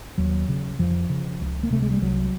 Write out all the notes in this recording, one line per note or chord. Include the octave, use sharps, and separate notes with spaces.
D#2 F#3
C#3
F2 F3
C#3
C#2
A#3
C3 A3
G#3
G3
C2 F#3